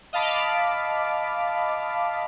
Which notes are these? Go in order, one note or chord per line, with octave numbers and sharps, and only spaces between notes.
D#5 F5 A5 B5 D6